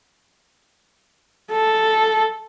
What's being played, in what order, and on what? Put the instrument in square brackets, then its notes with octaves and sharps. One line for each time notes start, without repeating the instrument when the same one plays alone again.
[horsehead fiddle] A4